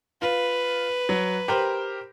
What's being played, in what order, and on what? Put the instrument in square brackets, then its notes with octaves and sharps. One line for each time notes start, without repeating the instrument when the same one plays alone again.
[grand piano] F4 [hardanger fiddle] B4
[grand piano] F#3
G4 A#4 C5